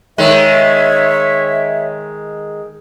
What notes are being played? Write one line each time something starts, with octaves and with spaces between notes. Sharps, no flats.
D#3 G#3 C#5 E5